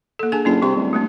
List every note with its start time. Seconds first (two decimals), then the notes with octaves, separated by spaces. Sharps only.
0.19 A#3 A4
0.32 D4 G#4 G#5
0.45 F#1 D4 F4 A5
0.62 C3 G3 C6
0.76 D1
0.93 A3 A#3 D4